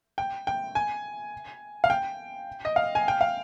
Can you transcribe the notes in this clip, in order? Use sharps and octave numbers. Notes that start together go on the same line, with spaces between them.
G5
G5
G#5
F5
G5
D#5
F5
G#5
G5
F5